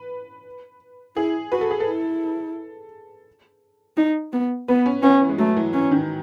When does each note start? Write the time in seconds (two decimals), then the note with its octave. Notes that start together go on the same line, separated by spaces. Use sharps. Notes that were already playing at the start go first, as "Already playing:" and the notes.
Already playing: B4
1.16 E4 G#4
1.52 F#4 B4
1.61 A4
1.71 G#4
1.80 A4
1.87 E4
3.97 D#4
4.33 B3
4.68 B3 B4
4.86 C#4
5.03 B3 C#4
5.21 E3
5.29 G#3
5.38 F#3 A3
5.56 E3
5.73 E3 C#4
5.91 D#3